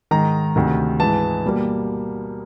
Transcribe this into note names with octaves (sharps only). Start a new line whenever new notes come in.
G#2 D#3 G#3 A#5
D2 C3 D#3
G#2 E3 G#3 A5
B2 G3 A#3